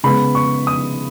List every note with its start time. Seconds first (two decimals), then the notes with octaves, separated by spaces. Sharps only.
0.04 C#3 G#3 B3 B5
0.35 C#6
0.67 D#6